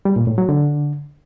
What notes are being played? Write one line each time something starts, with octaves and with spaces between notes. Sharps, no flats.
G3
A#2
A2
F#3
D3